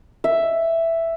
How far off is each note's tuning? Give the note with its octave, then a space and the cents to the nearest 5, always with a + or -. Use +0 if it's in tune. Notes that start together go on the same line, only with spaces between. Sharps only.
E5 +5